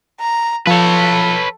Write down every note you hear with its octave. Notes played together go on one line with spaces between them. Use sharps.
A#5
F3 A4 B4 C#5